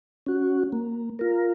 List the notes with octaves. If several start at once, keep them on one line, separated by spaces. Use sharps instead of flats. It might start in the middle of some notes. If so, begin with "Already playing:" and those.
C#4 F#4
A#3
F4 A#4